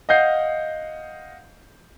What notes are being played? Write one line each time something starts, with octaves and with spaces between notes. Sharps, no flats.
D#5 F5 F#5 G6 C7